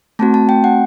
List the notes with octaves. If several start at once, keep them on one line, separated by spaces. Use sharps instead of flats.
A3 C4 F#4 A5
A5
G5
F#5